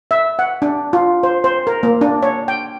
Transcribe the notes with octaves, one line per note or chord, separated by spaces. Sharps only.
E5
F#5
D4
F4
C5
C5
A#4
A#3
D4
C#5
G5